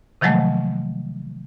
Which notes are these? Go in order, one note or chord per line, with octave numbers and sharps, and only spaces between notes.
C3 D#3 F3 F#3 G#3 A3